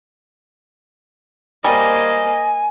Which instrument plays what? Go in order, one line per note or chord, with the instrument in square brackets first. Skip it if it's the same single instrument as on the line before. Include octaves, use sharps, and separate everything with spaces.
[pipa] G3 [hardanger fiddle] A#3 C5 [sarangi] D#5 [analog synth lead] G#5